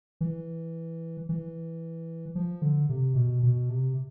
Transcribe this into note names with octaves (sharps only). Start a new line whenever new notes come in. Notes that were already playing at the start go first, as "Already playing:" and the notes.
E3
E3
F3
D3
C3
B2
B2
C3